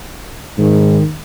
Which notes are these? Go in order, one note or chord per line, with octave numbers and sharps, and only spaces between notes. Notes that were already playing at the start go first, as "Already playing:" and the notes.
G#2 D#3